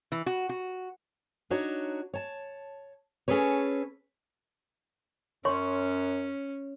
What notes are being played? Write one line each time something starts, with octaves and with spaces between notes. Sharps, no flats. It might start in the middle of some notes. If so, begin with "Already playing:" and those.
E3
F#4
F#4
D4 D#4 F#4 C#5
C#5 A5
C#4 G#4 A4 B4 C#5
F#2 C#4 C#5 C6 C#6